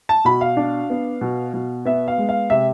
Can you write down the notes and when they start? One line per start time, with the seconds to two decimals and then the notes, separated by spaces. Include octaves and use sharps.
0.09 A5
0.25 B2 B5
0.41 F5
0.57 D4
0.90 B3
1.21 B2
1.54 B2
1.86 B3 E5
2.08 F5
2.18 G#3
2.29 F5
2.50 C3 E5